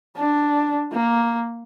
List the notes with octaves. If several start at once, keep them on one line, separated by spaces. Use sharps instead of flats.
D4
A#3